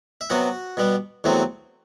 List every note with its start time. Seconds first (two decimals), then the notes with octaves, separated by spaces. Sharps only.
0.21 E5
0.30 C3 F#3 B3 F#4 F#5
0.77 B2 G3 B3
1.24 E2 C3 F#3 A3 C4